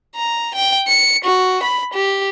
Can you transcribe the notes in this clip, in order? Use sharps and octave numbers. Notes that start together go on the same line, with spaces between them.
A#5
G5
C#7
F#4
B5
G4